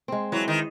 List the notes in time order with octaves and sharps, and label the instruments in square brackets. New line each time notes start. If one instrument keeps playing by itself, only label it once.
[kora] G#3 C4
[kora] E3 [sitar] F#3
[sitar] D#3